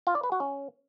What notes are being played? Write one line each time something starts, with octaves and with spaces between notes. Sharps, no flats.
F4
D5
B4
F#4
C#4